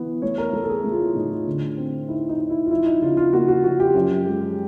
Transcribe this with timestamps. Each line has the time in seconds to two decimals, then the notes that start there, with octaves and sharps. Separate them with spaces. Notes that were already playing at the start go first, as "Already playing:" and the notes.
Already playing: E3 B3
0.22 A3 C#5
0.38 A#4
0.53 A3 A4
0.63 A4
0.69 G#4
0.84 A3
0.92 F4
0.99 E4
1.15 A2 D#4
1.31 F4
1.47 D3
1.78 C4
2.08 D#4 E4
2.29 D#4
2.39 D#4
2.50 E4
2.66 F4
2.71 F3 E4
2.86 D#4
3.02 C#3 F4
3.17 F4
3.33 A#3 F#4
3.48 F#4
3.64 F3 F#4
3.80 G4
3.95 F#2
4.26 G#3